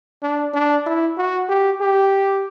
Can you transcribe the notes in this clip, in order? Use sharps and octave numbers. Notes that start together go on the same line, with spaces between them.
D4
D4
E4
F#4
G4
G4